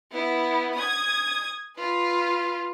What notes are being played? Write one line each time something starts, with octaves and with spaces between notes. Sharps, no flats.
B3 E4
D#6 G#6
F4 B4